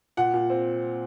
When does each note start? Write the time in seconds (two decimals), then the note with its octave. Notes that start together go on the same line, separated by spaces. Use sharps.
0.17 A#2 F#5
0.34 A#2
0.50 C4